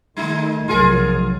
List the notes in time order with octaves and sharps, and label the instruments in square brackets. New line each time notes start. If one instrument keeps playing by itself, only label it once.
[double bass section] D#3 A3 [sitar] G3 D#4
[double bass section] F1 B1 F#3 [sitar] F4 G#4 A#4